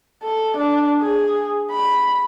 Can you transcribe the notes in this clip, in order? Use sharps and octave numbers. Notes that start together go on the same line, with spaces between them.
A4
D4
G#4
B5